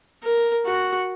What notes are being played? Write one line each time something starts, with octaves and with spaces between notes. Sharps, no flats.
A#4
F#4